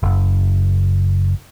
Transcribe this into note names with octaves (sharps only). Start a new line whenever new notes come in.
F#1